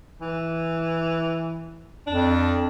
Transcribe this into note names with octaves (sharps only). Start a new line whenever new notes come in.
E3
F2 D4